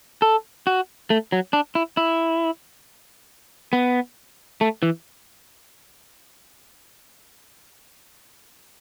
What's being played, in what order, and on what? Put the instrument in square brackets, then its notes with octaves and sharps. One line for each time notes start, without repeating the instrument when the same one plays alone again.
[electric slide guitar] A4
F#4
A3
F#3
D4
E4
E4
B3
A3
E3